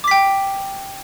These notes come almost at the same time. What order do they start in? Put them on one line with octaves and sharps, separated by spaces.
D6 B6 G5